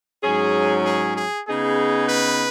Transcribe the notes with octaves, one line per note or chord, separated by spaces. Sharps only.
G#2 F#3 C#4 G#4
G#4
G#4
C#3 B3 D#4 G#4
B4